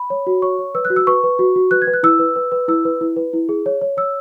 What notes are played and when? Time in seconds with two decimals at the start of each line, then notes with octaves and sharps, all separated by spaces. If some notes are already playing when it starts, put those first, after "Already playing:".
Already playing: B5
0.10 C#5
0.27 F#4
0.42 C#5 C#6
0.59 C#5
0.75 B4 E6
0.85 F#6
0.90 F#4
0.96 E6
1.07 B4 C#6
1.24 B4
1.39 F#4
1.56 F#4
1.71 B4 F#6
1.82 G#6
1.87 B4
1.94 F#6
2.03 E4 E6
2.19 B4
2.36 B4
2.52 B4
2.68 E4 E6
2.85 B4
3.01 E4
3.16 B4
3.33 E4
3.49 G#4
3.66 C#5
3.81 C#5
3.97 C#5 E6